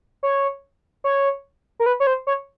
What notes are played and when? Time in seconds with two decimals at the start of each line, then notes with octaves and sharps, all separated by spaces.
0.23 C#5
1.04 C#5
1.80 A#4
1.86 B4
2.00 C#5
2.07 C5
2.27 C#5